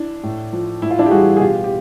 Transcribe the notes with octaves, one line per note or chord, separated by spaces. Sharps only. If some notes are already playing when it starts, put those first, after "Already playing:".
Already playing: D4 E4
A2
F3
A2 E4
F4
D4 E4
G4
E3 G3 F#4 G#4
G#4
B2 F4 G4
G4